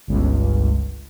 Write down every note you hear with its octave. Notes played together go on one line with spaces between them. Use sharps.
G1 C#2